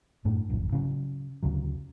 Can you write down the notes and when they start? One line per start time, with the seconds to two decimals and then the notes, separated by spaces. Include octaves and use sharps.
0.25 F#2 A2 A3 D4
0.50 D1 A#1 F#2
0.72 C#3 F3 F#3
1.43 D2 C#3 F#3